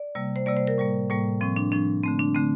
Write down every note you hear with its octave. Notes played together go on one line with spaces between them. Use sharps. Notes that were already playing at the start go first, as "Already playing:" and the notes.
Already playing: D5
C3 G3 A#3
C5
C3 G3 A#3 D5
C5
A#4
A2 G3 A#3
A2 G3 A#3
A2 F3 C4
D4
A2 F3 C4 D4
D3 A3 C4
D4
D3 A3 C4